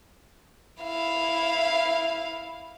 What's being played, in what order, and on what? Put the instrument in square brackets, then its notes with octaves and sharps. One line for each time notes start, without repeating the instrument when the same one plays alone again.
[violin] E4 F5